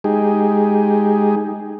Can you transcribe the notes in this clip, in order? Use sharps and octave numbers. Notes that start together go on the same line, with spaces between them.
G#3 D#4 G4 G#4